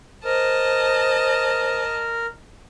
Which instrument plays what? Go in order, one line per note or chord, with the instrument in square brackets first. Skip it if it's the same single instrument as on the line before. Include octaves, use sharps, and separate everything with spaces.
[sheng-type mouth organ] A#4 [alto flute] C5 [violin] D#5 A5